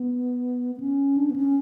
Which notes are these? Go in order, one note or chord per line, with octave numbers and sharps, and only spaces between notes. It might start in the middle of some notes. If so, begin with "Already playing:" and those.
Already playing: B3
B3
C#4
D4
B3
C#4